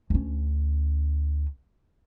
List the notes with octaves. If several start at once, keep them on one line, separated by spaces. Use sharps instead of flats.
D2 C#4